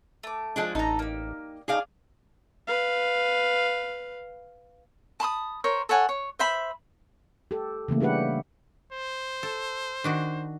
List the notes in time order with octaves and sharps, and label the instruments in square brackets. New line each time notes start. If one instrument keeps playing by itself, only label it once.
[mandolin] A3 D6
[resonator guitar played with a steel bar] F3 G#3 D4
[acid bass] A1 [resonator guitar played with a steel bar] D#4 [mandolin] A4 A#5
[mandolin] A#3 G4
[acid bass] D#4 [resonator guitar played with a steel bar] G#4 D5 F5
[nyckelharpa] B4 F5
[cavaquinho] A5 B5 C6 D#6
A#4 C5 C#5
A4 C#5 F#5 G#5
C#5
C5 E5 B5
[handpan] G4 A4
C#3 E3 A3 A#3
G3 D4 G4 B4 F#5
[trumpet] C5
[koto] A4
D#3 D4 F#4